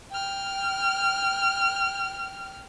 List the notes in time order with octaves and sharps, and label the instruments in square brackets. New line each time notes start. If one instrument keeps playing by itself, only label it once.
[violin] G5 F6